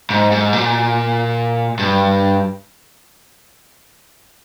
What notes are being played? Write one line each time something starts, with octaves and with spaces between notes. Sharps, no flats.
G#2
G#2
A#2
G2